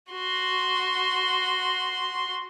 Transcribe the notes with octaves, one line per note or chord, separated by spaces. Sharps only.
F#4 C6